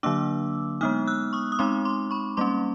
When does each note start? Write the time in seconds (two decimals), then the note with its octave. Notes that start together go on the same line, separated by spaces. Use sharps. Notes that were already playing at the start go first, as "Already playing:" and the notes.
0.03 D3 F#3 A#3 D4 D6 E6
0.81 G#3 B3 D#4 D#6 F6
1.07 E6 F#6
1.33 C#6 D#6
1.52 D#6
1.59 G#3 C4 D#4 C6 D6
1.85 C6 D6
2.11 B5 C#6
2.37 G3 A#3 C#4 C6 D6